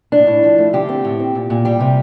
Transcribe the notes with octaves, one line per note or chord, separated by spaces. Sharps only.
A2 D4
A2
F3
A3
D3 G4
C4
A2
C4
A#2
A#2
G3 G4
C3